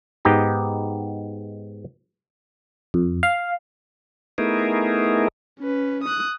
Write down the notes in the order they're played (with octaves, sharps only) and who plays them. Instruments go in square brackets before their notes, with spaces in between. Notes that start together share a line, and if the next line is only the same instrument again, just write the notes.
[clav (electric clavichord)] G#2 B3 D#4 G4 A#5
[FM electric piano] F2
F5
[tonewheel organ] A3 B3 D#4 E4 G#4 A#4
[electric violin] C#4 B4
D#6 F#6